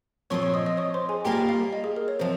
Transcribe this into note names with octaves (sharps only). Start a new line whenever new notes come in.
A#2 F3 C4 C#5 C#6
C#5 C#6
D#5 D#6
D#5 D#6
C#5 C#6
C5 C6
G#4 G#5
G3 A#3 F4 G4 A#4 G5
F5
D#5
G#4
A#4
C#5
C3 F3 C5